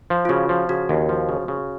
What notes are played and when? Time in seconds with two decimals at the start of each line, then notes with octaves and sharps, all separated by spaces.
0.10 F3
0.25 F4
0.29 C#3 F#4
0.49 F3
0.69 C#3 F#4
0.89 D#2
1.09 F3
1.29 C#3
1.48 C#3